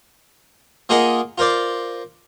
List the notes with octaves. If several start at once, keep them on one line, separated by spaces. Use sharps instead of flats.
A#3 F4 G#4 A#4 D#5 F#5
F4 A#4 C5 D5